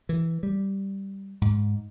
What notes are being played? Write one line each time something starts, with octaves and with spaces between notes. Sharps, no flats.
E3
G3
G#2